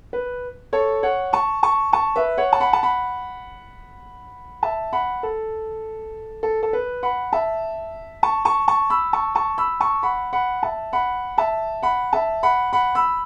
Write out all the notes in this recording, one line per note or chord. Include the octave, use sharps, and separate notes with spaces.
B4
A4 C#5
C#5 F#5
A5 C#6
A5 C#6
A5 C#6
B4 E5
C#5 F#5
A5
F#5 B5
A5
F#5 B5
E5 A5
F#5 B5
A4
A4
A4
B4
F#5 B5
E5 A5
A5 C#6
A5 C#6
A5 C#6
B5 E6
A5 C#6
A5 C#6
B5 E6
A5 C#6
F#5 B5
F#5 B5
E5 A5
F#5 B5
E5 A5
F#5 B5
E5 A5
F#5 B5
F#5 B5
B5 E6